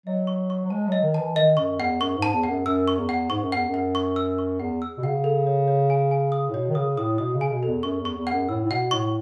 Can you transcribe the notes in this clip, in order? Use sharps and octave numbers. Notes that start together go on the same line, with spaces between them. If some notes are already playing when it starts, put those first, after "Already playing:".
F#3 D#5
C#6
C#6
F#3
G#3 A5
F#3 D#5
D#3
A5
E3
D#3 D#5
F#2 C#6
E2 F#5
F#2 C#6
G#2
A5
E2
F#5
F#2
F#2 E6
C#6
E2
F#5
G#2 C#6
F#2
E2 F#5
F#2
F#5
C#6
E6
C#6
E2 F#5
E6
B2
C#3 F#5
A4
C#5
C#5
G#5
G#5
D#6
A2
B2 C#5
D#3
C#3 D#6
A2 D#6
B2 D#6
C#3
G#5
B2
E2 A4
F#2 C#6
E2
C#6
E2
F#5
F#2
A2 E6
A2
B2 F#5
A2 C#6